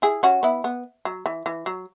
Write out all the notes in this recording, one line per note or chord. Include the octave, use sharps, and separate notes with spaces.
E4 G#4
C#4 F#4
B3 E4
B3
F#3
E3
E3
F#3